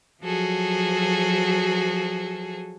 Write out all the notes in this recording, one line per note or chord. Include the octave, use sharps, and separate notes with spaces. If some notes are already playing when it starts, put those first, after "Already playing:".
F3 F#3 F#4 G#4 A4